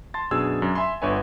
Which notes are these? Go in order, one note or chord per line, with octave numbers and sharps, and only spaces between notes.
A5 C6 A6
F#2 B2 D4 G#4 E6 G#6
F#2
E5 G#5 B5 C6
G1 D3 B4 C#5 E5 G#5